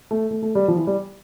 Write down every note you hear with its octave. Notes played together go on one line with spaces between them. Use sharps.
A3
A3
A3
G3
F3
E3
G3